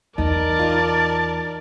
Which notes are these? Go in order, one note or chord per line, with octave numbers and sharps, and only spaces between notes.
E2 D#4 A#4 D5 A5
D#4 F4